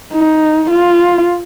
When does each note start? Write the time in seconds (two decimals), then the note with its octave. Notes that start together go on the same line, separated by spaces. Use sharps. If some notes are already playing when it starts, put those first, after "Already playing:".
0.14 D#4
0.71 F4